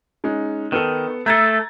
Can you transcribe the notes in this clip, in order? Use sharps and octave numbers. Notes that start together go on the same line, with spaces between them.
G#3 C#4 D#4
D#3 B3 A4
A3 A4 A#5 G#6 A6